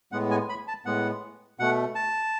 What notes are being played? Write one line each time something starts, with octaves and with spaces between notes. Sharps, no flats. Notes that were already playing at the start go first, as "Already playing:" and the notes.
A2 G#3 B3 F#5
G#5
B5
A5
A2 G#3 B3 F#5
B2 A3 F#5
A5